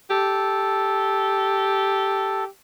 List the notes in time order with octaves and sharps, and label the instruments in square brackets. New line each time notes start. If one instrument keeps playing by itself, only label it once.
[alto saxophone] G4 [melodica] A4